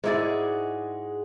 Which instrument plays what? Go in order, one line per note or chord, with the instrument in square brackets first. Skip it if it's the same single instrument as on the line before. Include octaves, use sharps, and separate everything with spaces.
[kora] G#2 E4 D5 [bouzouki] G#3 F#4 G#4